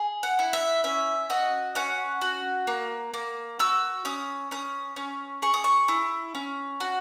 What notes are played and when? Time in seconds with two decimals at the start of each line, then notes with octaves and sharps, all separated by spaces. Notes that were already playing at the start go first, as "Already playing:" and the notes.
Already playing: G#4
0.23 F#5
0.39 E4
0.53 E5
0.84 C#4 E5
1.30 F#4 D#5
1.75 C#4 F#5
2.21 F#4
2.67 A#3
3.14 A#3
3.59 F#4 E6
4.05 C#4 D#6
4.51 C#4 D#6
4.96 C#4
5.42 G#4 C#6
5.54 D#6
5.64 C#6
5.88 E4
6.35 C#4
6.80 F#4